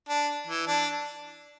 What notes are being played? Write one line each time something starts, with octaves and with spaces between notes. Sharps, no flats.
D4
E3
D4